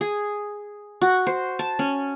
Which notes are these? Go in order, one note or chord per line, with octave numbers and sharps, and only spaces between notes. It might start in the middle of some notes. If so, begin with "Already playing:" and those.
G#4
F#4
C5
A5
C#4